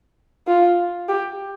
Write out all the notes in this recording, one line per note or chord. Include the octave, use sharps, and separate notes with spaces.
F4
G4